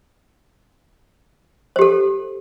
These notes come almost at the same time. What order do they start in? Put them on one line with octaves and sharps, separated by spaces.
C5 G4 A4